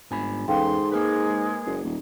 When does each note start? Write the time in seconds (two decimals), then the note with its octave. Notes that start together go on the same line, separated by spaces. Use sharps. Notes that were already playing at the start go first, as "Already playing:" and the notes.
0.11 G1 G#2 G#5 B5
0.48 E2 G#2 C#4 A4 B4 F5 G5 C6
0.92 G#3 A#3 A#4 B4
1.66 F#1
1.84 D#1